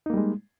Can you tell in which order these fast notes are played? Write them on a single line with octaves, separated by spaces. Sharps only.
D#4 A#3 G3 G#3